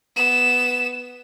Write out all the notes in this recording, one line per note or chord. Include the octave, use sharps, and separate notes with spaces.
B3 E7